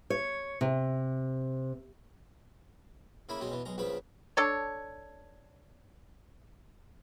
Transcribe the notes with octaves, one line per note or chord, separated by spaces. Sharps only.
C#5
C3
C#3 A#3 E4 B5
B2 G#3 C4 C#4
B2 E3
B1 G#3 A#5
A#1 G#2 C#3 F3 B4 B5
D4 A4 C#5